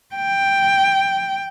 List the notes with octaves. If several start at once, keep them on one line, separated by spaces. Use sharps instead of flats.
G5